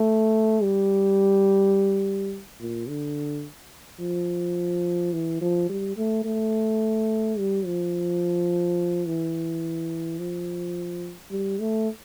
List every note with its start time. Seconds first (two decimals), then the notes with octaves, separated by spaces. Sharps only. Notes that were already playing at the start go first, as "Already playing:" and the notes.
Already playing: A3
0.63 G3
2.60 A#2
2.88 D3
4.01 F3
5.13 E3
5.41 F3
5.70 G3
5.97 A3
6.25 A3
7.38 G3
7.66 F3
9.06 E3
10.19 F3
11.31 G3
11.59 A3